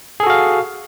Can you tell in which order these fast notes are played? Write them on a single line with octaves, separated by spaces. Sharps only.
G#4 A4 F#4 F5